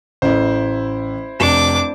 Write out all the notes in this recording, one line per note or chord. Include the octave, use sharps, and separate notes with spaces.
A1 E4 C5
F1 D4 D6 E7